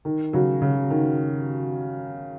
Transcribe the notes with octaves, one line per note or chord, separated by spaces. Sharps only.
D#3
C#3 F#3
C#3
D#3